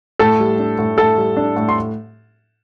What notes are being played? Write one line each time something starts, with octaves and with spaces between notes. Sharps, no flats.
A2 A4 A5
G3
D4
A2
A2 A4 A5
G3
D4
A2
C6